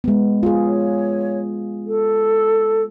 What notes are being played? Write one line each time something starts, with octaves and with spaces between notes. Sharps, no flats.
G#3 B3
F4 G#4
C#5
A4